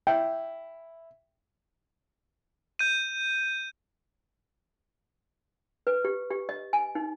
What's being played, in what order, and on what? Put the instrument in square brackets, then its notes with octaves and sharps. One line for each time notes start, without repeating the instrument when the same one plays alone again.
[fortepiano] E4 [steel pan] G5
[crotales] G6 D#7
[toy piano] B4
G4
G4
D#5
G#5
D#4